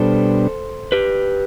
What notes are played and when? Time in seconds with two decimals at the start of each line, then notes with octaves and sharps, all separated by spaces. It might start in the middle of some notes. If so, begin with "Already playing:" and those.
Already playing: B2 G3 D4 A4 C5
0.92 G4 B4